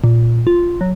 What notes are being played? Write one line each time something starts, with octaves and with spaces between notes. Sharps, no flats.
A#2
F4
F#3